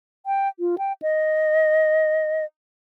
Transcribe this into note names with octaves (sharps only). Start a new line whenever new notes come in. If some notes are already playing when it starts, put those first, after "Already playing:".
G5
F4
G5
D#5